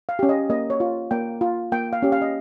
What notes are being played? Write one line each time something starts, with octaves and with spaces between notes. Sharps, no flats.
F5
C#4 G4
D#5
A#3 D#5
C#5
F4
A#3 G5
F4
A#3 G5
F5
C#4 G4
F5
D#5